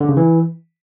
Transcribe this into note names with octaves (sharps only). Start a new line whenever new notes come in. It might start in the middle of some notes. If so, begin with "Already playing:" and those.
D3
C#3
E3